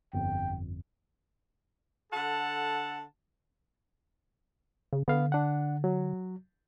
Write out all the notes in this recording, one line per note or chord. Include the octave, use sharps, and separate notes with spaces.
G1 F2 G5
D3 A4 F#5 A5
C#3
D3 B3 F5
D4 F#5
F#3